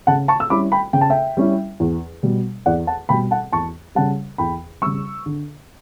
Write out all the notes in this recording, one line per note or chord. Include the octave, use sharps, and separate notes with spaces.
C#3 F#5 A5
A5 C#6
E6
G3 C#4 E4 B5 D6
G5 B5
C#3 G5
A5
E5 G5
G3 C#4 E4
E2
B2 G3
E2 D5 F#5
F#5 A5
B2 G3 G5 B5
F#5 A5
E2 A5 C#6
C#3 G3 F#5 A5
E2 G5 B5
C#3 G3 C#6 E6
D3